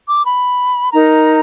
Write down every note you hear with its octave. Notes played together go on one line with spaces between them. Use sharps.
D6
B5
D#4 A#4 A#5